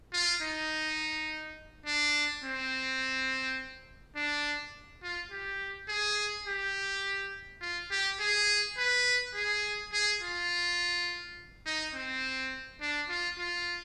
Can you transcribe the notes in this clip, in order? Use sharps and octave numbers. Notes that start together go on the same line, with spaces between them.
F4
D#4
D4
C4
D4
F4
G4
G#4
G4
F4
G4
G#4
B4
G#4
G#4
F4
D#4
C4
D4
F4
F4